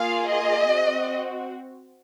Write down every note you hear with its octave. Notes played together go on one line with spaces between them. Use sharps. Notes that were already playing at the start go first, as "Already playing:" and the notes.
Already playing: A#3 F4 G#4 F5
D#5
C4 F#4